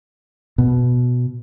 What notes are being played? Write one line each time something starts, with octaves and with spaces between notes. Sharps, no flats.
B2